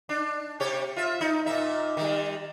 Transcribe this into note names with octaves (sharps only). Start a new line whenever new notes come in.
D4
C3 G4 C#5
F4 E5
D#4
A#2 D#4 E5
D#3 G3